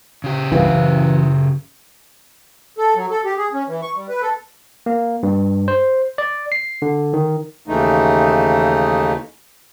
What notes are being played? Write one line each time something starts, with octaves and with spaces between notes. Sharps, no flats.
C#3 G4
C2 G2 E3 F#4 B4 F5
F#2
A4
F#3
A4
G4
G#4
C#4
E3
C#6
G3
B4
A4
A#3
G2
C5
D5
C7
D3
D#3
D#2 C#3 E3 A3 D#4